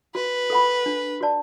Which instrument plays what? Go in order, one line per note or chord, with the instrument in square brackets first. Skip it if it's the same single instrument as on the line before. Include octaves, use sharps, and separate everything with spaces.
[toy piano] F#4 [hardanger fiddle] B4
[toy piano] A4 F#5 B5
D4
F#4 D5 A5